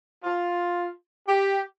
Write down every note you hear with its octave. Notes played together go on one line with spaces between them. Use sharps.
F4
G4